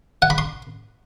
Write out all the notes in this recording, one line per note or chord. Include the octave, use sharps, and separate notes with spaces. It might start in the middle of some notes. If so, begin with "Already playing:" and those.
F#5
B5
C6